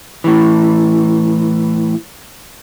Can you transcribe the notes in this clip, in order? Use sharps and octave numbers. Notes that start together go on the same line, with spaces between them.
A2 E3